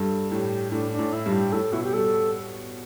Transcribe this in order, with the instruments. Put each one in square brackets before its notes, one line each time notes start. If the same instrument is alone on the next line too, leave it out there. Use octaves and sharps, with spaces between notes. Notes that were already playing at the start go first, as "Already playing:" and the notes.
Already playing: [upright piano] G2 [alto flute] A4
[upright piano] A2 [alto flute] G4
[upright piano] A2 [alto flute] D4
[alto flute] D4
[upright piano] A2
[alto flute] E4
[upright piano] G2
[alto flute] G4
[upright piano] A2 [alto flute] A4
[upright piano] B2 [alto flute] E4
[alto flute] G4
[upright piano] G3 [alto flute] A4